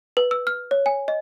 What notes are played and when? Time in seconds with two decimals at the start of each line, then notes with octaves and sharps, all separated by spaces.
0.17 B4
0.31 E6
0.47 F6
0.71 C#5
0.86 G#5
1.08 D#5